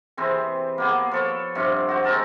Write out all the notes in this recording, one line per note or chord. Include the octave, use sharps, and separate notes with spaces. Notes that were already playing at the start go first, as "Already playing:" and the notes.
C3 E3 C4 G#4
A#3 B3 G#4
F3 A4 C#5
G2 C3 F3
F#4 C5
G#3 C4 A#4 A5